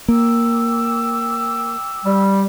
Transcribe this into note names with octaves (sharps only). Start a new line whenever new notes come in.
A#3 G5 D6 E6
G3